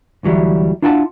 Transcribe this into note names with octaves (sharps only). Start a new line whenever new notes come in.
D2 E3 F#3 G3 E4
D4 E4 F4 F#5 G#5 A5